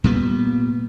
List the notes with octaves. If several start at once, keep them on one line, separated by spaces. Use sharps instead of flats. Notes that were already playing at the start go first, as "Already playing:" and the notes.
A#2 G3 B3